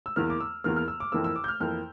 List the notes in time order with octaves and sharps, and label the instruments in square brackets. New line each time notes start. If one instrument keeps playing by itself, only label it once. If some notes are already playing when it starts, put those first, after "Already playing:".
[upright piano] E6
E2 E3 A#3 F6
D6
E6
E2 E3 A#3 F6
F6
E6
D6
F2 E3 A#3 E6
E6
D6
G6
F6
F2 E3 A#3 F6